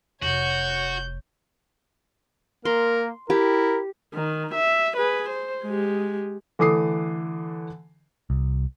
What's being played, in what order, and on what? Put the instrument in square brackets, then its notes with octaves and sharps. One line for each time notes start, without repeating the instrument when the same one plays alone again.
[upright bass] F1 [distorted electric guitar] F#4 [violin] C#5 [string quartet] G6
[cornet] A#3 [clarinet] A#4 [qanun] C6
[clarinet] E4 [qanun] G4 [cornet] A#4
[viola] D#3
E5
G#4 B4
C5
G#3 G4
[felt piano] D3 E3 A3 D6 D#6 C7
[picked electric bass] C2